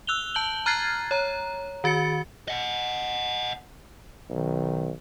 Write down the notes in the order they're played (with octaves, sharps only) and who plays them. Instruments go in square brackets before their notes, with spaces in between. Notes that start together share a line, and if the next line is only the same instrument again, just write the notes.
[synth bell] E6 F#6 F7 G7
A5 G6 F#7 G7
A#5 F6 F#6 G#6 A6 C7
C#5 A#5
D#3 F#4 A6 C#7
[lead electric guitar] D#5 F#5
[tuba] B1 [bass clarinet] D#3